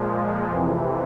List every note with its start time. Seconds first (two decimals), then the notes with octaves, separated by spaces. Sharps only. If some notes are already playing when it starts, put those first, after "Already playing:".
Already playing: A#2 F3 G#3
0.50 F2 C3 E3